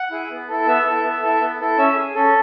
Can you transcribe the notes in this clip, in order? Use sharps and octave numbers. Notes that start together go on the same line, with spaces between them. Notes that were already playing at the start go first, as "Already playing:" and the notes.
Already playing: F#5
E4 G#4
B3
E4 A4
B3 E5
E4 A4
B3
E4 A4
B3
E4 A4
C#4 E5
G#4
C#4 A4